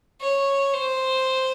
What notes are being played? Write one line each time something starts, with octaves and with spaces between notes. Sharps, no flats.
C#5
C5